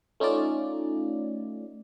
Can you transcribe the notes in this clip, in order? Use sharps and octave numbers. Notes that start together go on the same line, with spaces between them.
A3 C#4 D#4 F4 D5